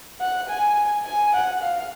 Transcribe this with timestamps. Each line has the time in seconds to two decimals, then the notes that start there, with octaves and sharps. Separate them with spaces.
0.21 F#5
0.49 G#5
1.05 G#5
1.33 F#5
1.62 F5